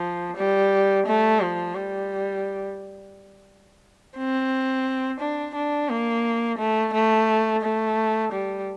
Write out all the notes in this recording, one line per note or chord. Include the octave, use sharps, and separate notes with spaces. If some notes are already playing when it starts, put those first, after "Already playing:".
Already playing: F3
G3
A3
F3
G3
C4
D4
D4
A#3
A3
A3
A3
G3